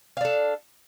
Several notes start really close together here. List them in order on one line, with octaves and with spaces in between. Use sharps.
F5 D4 A4